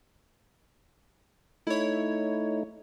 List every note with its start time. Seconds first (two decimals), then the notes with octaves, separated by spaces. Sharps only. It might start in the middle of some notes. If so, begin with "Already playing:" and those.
1.67 A3 D#4 E4 C#5